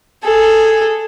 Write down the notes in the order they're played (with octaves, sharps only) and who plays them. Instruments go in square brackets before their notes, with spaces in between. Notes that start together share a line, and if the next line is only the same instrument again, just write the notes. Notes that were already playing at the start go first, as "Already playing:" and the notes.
[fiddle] G#4 A4